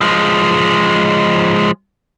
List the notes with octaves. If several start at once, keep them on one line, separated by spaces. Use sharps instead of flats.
F3 G#3